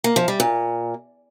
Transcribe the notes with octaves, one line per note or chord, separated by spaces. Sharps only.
A#3
F3
G3
A#2